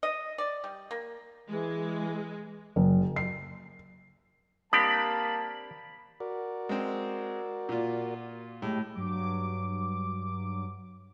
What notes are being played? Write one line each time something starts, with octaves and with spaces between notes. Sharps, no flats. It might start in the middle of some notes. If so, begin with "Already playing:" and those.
D#5
D5
G3
A#3
E3 G#3
F#1
C7
A#3 C4 D4 G4 A5 B5 D#6
F#4 A#4 D5
G#3 C4
A#2 F4
A2 G#3 G4
G2 F#3 D6